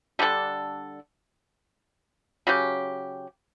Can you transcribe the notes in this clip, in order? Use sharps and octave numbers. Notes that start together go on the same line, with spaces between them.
D3 G3 D4 A4
C#3 F#3 C#4 G4